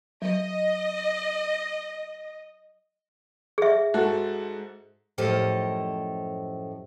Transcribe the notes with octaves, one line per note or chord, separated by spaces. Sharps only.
F#3 D#5
G#4 E5
G#2 F#4 A4
F#2 A2 F3 G4 A4 D#5